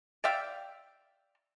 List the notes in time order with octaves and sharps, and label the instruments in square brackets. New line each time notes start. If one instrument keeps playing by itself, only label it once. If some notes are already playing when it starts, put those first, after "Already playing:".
[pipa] D5 E5 F5 G5